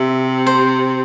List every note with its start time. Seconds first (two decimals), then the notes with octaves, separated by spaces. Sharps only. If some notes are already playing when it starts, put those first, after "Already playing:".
Already playing: C3 E5
0.47 C5